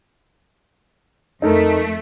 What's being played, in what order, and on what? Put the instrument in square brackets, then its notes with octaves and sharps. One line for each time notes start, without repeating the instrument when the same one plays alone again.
[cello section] F2 A3 [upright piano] D#4 A4 A#4